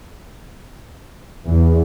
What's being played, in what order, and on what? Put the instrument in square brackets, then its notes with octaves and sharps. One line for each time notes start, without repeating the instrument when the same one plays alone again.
[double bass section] E2